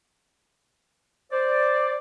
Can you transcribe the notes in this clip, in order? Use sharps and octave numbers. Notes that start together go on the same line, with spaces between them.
C5 D5